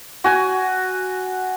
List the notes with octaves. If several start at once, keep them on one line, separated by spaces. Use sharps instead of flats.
F#4 G#5